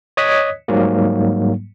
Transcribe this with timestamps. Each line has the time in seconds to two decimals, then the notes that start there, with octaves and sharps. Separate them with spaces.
0.17 C#5 D#5 D#6 F#6 G#6 B6
0.68 G#2 F#3 G3 A#3